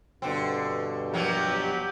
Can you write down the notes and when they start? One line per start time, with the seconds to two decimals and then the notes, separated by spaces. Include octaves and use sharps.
0.22 G2 B2 D3 C4
1.14 F3 F#3 A#3 G4